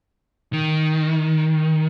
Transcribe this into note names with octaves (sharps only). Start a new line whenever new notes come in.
D#3